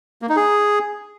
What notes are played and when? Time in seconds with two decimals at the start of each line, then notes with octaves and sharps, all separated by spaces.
0.22 A#3
0.29 D#4
0.36 G#4